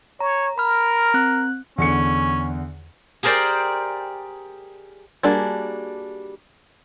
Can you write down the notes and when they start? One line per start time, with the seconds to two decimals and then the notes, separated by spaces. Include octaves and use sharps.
0.21 C#5 A#5
0.58 A#4 B5 F6
1.14 C4 F#6
1.78 E2 D3 C#4 C#7
3.23 G4 G#4 A#4 C5 D5 G5
5.23 G3 A#3 D4 F#4 G#4